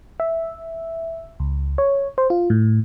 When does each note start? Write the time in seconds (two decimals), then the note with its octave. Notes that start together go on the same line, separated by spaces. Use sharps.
0.20 E5
1.40 C#2
1.78 C#5
2.18 C5
2.30 F4
2.50 A2